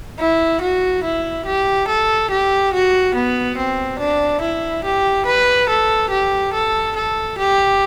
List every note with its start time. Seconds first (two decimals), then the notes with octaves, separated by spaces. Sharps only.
0.20 E4
0.61 F#4
1.03 E4
1.46 G4
1.88 A4
2.31 G4
2.73 F#4
3.15 B3
3.57 C4
3.99 D4
4.41 E4
4.84 G4
5.26 B4
5.69 A4
6.10 G4
6.53 A4
6.96 A4
7.38 G4